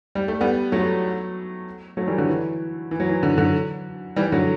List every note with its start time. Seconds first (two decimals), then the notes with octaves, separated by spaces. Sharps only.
0.15 G3
0.28 A3
0.41 G3 B3
0.72 F#3 A3
1.97 F#3 A3
2.07 E3 G3
2.18 D3 F#3
2.28 E3
2.91 E3
3.00 F#3
3.09 E3
3.23 D3
3.38 D3 F#3
4.16 E3 G3
4.32 D3 F#3